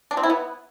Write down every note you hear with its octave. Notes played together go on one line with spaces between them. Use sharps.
D4
C4
E4
B3